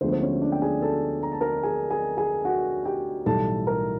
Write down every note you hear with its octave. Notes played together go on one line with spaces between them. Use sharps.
D2 D3 F3 G#3 B3 C5
C5
C#4 C#5
D4 D5
G5
G#4 G#5
A4 A5
A#5
A5
A#4 A#5
G#4 G#5
G#4 G#5
G#4 G#5
F#4 F#5
G4 G5
B1 A2 E3 G3 A4 A5
A#4 A#5